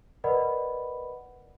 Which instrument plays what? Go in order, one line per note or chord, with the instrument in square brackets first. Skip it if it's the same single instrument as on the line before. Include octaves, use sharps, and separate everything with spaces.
[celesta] A#4 B4 D5 D#5 F#5 B5